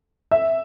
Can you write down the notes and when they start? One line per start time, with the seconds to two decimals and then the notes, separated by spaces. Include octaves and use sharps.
0.31 E5